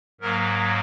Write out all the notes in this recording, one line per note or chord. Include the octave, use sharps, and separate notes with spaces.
G#2 F#3 A#3 A#4